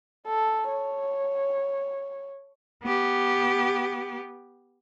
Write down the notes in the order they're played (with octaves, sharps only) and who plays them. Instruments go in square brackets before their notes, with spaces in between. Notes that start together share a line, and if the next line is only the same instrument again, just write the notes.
[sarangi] A4
C#5
[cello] B3 G4